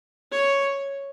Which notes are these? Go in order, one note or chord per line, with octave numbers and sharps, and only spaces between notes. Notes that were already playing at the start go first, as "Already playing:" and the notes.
C#5